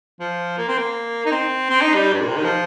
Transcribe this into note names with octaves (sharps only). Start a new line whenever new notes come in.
F3
A#3
C4
A#3
D#4
C4
C4
D#4
G3
G2
A#2
C3
D#3
F3